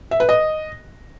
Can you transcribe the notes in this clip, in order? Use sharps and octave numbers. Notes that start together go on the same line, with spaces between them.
E5
B4
D#5